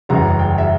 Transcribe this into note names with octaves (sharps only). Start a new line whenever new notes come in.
F#1 E2 C#3 E3 G3 A#5
G5
E5